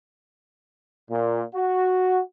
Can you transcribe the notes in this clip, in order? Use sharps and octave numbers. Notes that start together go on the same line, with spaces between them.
A#2
F#4